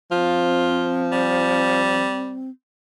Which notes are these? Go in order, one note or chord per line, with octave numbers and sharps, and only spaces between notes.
F3 C4 F4
G3